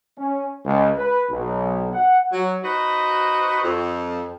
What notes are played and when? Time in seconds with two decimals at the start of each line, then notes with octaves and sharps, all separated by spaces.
0.17 C#4
0.65 C#2
0.97 B4
1.30 B1
1.93 F#5
2.32 F#3
2.64 D#4 F#4 B4 C5
3.63 F2